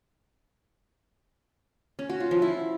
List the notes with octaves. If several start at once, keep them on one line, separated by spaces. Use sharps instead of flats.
C#4
F#4
F4
F3
E4